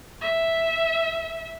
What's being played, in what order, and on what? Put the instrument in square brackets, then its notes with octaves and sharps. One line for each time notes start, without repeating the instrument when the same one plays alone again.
[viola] E5